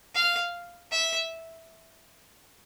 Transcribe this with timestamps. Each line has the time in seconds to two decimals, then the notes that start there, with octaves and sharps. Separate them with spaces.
0.15 F5
0.92 E5